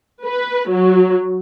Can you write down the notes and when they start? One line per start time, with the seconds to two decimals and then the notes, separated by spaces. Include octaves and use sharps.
0.24 B4
0.68 F#3